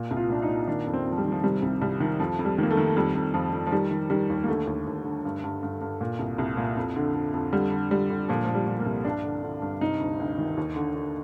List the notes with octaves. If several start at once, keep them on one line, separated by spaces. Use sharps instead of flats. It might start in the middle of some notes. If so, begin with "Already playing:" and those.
Already playing: A#2
C2
F4
A#2 D4
D#4
A#2
D#3 D4
F2
C4
F2
F3
G3
D#3
F3
C3 G3
C2
C2 G3
D#3
F2 F3
F2
G3
D#3 A#3
A3
D#3
F2 G3
F2
F2 F3
F2
F3
D#3 G3
D#3
D#3 G3
D#2
A#3
D3 A3
D#2
D#2
D3
G2
G2
G2
G2
A#2
C2
C2
A#2
F2
D3
F2
F2
D3 G3
D3
D3 G3
D3
A#2 F3
F3
A#2
G3
A#2
A#3
C2
G2 D4
D3
D3
G2
C3 D#4
D2
D2
D#3
D#2
D3
D3